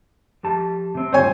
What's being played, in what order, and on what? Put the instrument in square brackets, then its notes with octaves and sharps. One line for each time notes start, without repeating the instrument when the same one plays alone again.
[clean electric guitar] F2 G4 A5
C3 C4
[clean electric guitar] D2 G2 [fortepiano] C5 C#5 G#5